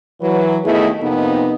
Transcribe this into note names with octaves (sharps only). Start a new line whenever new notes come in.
E3 F#3 B4
D#2 A3 B3 E4 G#4 D#5
F2 C3 A#3 B3 D#4